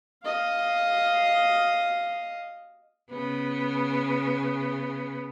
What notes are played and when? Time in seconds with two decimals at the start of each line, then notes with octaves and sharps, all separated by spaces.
0.24 D#5 F5
3.11 C#3 B3